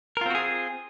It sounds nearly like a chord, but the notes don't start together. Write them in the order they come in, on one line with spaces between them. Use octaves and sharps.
A#4 F4 C4 F#4 G#4